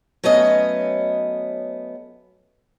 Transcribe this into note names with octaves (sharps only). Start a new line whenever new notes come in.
F#3 A3 B3 C#4 D#5